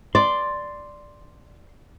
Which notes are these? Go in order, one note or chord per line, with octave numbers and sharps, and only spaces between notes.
D5 C6